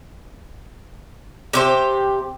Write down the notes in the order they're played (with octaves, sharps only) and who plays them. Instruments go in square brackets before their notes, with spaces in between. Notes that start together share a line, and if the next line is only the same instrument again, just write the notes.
[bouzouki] C3 G4 C5